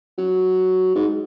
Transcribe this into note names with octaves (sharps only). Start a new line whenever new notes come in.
F#3
G#2